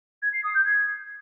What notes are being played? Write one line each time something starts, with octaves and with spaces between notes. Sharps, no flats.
G#6
C7
D#6
G6
G#6